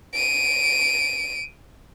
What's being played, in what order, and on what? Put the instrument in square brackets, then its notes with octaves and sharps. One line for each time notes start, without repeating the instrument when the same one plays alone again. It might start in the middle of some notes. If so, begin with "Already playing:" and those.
[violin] D7 D#7